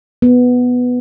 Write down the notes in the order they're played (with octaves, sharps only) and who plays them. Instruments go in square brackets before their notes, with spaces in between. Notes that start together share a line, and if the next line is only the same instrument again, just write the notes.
[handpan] B3